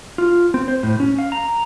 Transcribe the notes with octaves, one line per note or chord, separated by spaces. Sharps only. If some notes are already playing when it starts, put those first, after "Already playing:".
F4
C4
C5
A2
C#4
F5
A#5